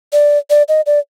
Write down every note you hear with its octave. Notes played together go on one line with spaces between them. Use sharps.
D5
D5
D#5
D5